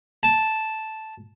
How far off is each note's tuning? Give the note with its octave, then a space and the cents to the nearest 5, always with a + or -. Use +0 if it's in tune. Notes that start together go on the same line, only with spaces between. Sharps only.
A5 -5